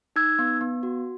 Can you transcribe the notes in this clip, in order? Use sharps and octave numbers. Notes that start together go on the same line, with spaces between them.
D#4 E6 G#6
B3
B3
F#4